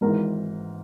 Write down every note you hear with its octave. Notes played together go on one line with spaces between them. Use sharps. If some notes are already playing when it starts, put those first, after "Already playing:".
G#1 G#2 E3 A#4